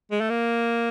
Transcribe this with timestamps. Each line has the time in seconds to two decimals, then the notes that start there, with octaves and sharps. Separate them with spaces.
0.11 G#3
0.21 A3
0.30 A#3